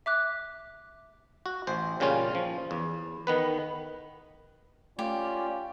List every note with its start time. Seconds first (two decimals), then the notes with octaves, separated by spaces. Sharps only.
0.06 E5 D6 F#6
1.46 F#4
1.67 A1 C5
2.00 A#2 C#3 G3 C#4 F4
2.35 F3
2.71 E2
3.27 D#3 B3 B4
4.99 A3 C#4 F4 G4 D5